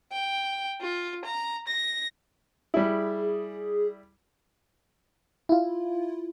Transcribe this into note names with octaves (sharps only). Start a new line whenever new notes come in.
G5
F4
A#5
A#6
G3 E4 G#4
E4 F4